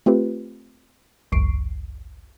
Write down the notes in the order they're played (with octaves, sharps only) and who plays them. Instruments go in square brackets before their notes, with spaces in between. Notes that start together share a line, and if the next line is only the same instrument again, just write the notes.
[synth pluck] A3 C4 F4 G4 B4
G#1 C#2 F#2 C#6 C7 D7